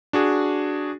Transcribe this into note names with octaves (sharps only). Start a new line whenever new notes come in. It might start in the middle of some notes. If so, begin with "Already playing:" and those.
D4 F#4 G#4